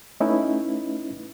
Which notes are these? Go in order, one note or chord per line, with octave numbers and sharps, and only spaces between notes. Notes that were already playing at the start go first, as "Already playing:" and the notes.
A3 C#4 D#4 E4 B4